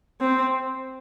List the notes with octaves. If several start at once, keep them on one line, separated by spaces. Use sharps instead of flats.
C4